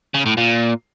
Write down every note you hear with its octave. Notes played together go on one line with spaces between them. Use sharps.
C#3
A2
A#2